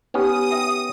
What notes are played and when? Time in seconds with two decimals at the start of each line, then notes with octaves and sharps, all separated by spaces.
0.14 B3 C#4 D#4 G4 D#6
0.51 B4 E5 G5